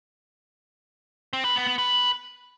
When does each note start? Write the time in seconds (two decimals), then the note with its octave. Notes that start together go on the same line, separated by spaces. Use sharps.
1.33 C4
1.45 B4
1.56 B3
1.67 B3
1.78 B4